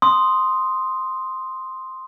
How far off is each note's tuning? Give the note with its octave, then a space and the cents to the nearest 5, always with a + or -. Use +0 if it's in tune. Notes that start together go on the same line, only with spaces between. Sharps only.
C6 +0 D#6 +0